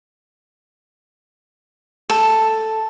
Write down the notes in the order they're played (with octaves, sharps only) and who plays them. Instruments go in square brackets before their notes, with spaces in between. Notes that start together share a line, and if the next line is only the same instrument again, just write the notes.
[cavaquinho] A4